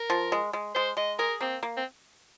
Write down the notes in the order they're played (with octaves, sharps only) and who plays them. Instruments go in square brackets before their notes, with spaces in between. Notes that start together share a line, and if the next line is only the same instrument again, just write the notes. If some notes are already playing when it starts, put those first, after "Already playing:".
Already playing: [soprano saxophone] A#4
[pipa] F3
G#3
G#3
[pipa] G#3 [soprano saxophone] C5
[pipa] G#3 [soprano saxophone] D#5
[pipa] G#4 [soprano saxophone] A#4
[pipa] A#3 [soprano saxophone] C4
[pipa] A#3
[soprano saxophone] C4